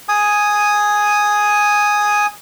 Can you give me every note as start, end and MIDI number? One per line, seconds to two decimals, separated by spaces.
0.09 2.26 80
0.09 2.26 87